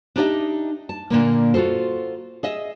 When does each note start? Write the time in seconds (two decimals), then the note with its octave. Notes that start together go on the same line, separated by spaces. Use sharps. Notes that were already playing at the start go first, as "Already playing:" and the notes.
0.16 D4 D#4 G4 C5 D#5 E5
0.89 A5
1.10 A#2 D3 A#3
1.54 F4 F#4 G#4 A4 C5
2.43 G#4 D#5 E5